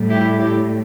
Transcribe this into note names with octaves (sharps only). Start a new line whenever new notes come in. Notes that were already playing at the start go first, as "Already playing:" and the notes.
Already playing: A2 G3
E4 G4
E4 G4